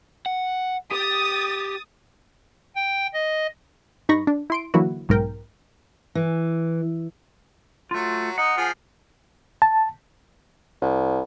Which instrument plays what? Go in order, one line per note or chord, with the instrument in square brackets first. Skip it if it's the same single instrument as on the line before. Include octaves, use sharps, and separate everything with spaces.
[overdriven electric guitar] F#5
[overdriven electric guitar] G4 [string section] D#6 A6
[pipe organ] G5
D#5
[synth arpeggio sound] G2 D#4 B5 C#6 A#6
D4
E4 C6 D7
D3 E3 F#3 A#3 E4 F#4
B1 G#2 A#4 G5
[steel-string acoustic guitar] E3
[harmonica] F#3 [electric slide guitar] A3 F4
[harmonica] D#4 [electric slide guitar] F#5
[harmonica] F3 F4 G#4
[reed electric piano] A5
[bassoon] C2